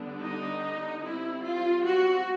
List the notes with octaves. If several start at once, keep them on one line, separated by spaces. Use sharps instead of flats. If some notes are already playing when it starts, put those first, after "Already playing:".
Already playing: D3 G3 B3 D4
D#4
G3 C4 E4
F4
F#4